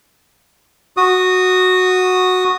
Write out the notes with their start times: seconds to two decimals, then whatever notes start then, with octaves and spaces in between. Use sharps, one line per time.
0.97 F#4 D#6